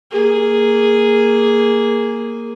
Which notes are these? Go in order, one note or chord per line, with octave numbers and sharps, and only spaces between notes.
A#3 G#4